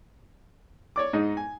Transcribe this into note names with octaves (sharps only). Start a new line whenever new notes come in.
C#5 D5 D6
G#2 D#4 D#5
G#5